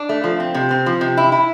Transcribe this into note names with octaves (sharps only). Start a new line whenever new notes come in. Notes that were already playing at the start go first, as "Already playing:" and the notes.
Already playing: D4
A3
F3
C4
C3
C4
F3
C3
E4
E4